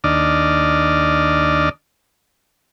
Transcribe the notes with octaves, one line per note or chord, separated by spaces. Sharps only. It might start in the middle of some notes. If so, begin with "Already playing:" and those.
D#2 D4 D5 D#5 F6